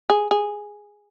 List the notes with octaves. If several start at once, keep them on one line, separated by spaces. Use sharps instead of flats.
G#4
G#4